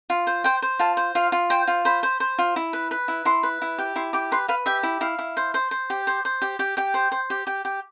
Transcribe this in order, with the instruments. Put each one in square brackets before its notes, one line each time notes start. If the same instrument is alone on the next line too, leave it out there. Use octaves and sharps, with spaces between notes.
[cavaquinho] F4
C5
C5 G5
C5
F4 A5
C5
F4 F5
F4
C5 G5
F4
C5 B5
C5
C5
F4
E4
B4
B4
E4
E4 C6
B4
E4
G4
E4 C6
G4 D6
B4 C6
B4 F5
G4 E5
E4
E4 F5
E4
C5
C5
C5
G4
C5
C5
G4
G4
G4 G5
C5
C5
G4
G4
G4